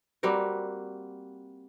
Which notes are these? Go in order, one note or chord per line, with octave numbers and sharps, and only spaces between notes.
G3 A#3 C4 F#4